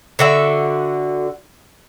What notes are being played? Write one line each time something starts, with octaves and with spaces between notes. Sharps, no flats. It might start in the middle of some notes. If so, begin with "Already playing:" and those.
D3 F#4 E5